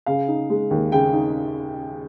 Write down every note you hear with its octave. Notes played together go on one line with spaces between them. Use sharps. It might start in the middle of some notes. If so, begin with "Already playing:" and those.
C#3 F5
D#4
G#3
D#2
C#3 G5
D#4